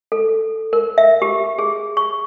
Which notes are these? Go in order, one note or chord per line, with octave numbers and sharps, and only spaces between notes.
A4
A#4
E5
G4
G#4
C#6